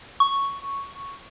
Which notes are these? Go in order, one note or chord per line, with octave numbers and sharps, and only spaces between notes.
C#6